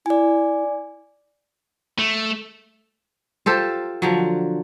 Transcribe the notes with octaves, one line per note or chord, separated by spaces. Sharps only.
E4 D5 G#5
A3
F4 G4 A4 C5
D3 F3 F#3